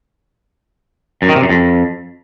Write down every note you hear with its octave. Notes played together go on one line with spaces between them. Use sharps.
F#2
D#3
C3
F#2
F2